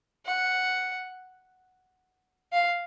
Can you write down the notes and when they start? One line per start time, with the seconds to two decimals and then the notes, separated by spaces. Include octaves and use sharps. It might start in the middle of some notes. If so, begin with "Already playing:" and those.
0.26 F#5
2.53 F5